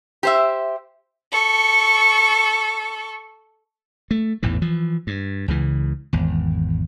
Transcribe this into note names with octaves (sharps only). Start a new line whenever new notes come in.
G4 C5 E5
A4 C#6
A3
A1 E2 G#2 E3
E3 F3
G2
C#2 C#3 E3
G#1 E2